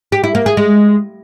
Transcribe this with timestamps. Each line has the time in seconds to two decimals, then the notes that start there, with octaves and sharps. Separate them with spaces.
0.12 G4
0.24 E4
0.35 A#3
0.46 G#4
0.57 G#3